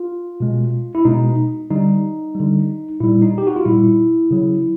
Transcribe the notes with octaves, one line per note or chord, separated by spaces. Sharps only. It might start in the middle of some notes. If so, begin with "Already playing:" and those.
Already playing: F4
B2 G#3
E4
B2 G#3 D#4
D3 G3 D#4
D3 G3
A#2 G3 E4
D#4
G4
F#4
F4
A#2 G3 E4
C#3 F#3